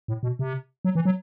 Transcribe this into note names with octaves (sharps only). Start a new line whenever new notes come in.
A2
B2
C3
F#3
E3
F#3